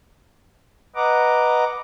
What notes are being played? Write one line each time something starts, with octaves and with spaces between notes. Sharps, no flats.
B4 D#5 F#5 A#5 D6